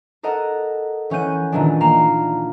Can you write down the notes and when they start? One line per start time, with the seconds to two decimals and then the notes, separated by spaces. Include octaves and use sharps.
0.23 A4 A#4 D#5 F#5
1.10 E3 C#4 F#5 G6 D#7
1.52 A#2 D#3 E3 G#3 D4
1.81 A#3 F5 A#5 E7